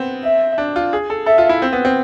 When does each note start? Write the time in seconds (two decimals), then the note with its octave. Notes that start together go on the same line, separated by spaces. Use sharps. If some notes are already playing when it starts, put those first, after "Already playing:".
Already playing: B3 C4
0.23 E5
0.58 D4
0.76 F4
0.93 G#4
1.10 A4
1.26 A4 E5
1.38 F4
1.49 E4
1.62 C4
1.73 B3
1.85 C4